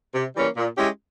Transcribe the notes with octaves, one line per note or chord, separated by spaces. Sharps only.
C3
E3 G3 A#3 C#4
A#2
G#3 C#4 E4 G4